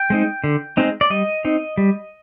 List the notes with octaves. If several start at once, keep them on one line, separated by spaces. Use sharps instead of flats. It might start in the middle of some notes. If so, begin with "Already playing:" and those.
Already playing: G5
G#3 C4 D#4
D3
G#3 C4 D#4
D5
G3 D#5
C4 D#4
G3